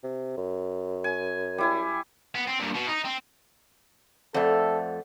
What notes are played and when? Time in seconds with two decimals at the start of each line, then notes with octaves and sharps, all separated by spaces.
0.04 C3
0.37 F#2
1.04 G#5
1.58 G3 E4 G#5
2.35 B3
2.47 C4
2.60 G2 A#2
2.75 B2 B3
2.88 D#4
3.05 C4
4.34 F2 A3 A4 C5 D5 F#5